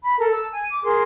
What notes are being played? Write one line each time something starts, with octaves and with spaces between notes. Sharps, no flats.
B5
A4 A#4 A#5
A5 E6
G#5
D6
G#4 A#4 C6